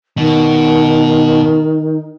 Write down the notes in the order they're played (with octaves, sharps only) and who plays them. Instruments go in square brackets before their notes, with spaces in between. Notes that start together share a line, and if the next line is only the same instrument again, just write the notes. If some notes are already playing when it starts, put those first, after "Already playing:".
[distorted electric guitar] B2 [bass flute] D#3